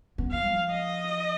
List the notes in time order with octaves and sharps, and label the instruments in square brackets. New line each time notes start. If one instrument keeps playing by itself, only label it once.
[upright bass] B3
[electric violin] F5
[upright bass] F3
[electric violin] D#5